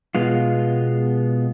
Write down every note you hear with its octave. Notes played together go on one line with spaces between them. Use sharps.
B2 G#3 B3 F4